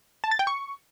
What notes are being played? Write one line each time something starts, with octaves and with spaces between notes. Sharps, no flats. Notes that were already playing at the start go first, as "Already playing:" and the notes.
A5
A6
G5
C#6